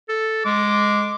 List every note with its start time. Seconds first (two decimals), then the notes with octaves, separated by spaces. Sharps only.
0.09 A4
0.45 G#3 D6